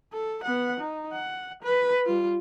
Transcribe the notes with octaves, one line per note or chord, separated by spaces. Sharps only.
A4
B3 F#5
D#4
F#5
B4
G3 F4